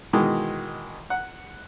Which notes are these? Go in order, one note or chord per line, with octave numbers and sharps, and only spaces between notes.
B2 D#3 E3 G#3
F#5